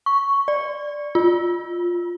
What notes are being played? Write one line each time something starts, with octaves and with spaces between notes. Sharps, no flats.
C#6
D5
F4